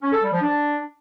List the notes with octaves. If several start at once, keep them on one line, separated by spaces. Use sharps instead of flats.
C#4
A4
G3
F3
D4